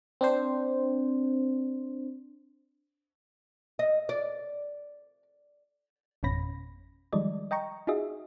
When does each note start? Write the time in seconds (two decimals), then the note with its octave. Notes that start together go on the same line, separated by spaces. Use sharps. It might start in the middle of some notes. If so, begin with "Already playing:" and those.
0.21 C4 D4 C5
3.79 D#5
4.09 D5
6.23 G#1 F2 B2 C#4 B5 A#6
7.13 D#3 F3 G3 G#3 D5 D#5
7.51 D#5 G5 A#5 C#6
7.87 D#4 F4 F#4 G#4 D#5 E5